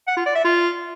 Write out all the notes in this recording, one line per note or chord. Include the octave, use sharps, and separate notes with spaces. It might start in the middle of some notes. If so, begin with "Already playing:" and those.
F#5
F4
D5
E5
F4